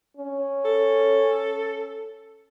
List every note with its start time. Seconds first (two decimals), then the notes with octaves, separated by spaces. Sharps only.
0.17 C#4
0.65 A4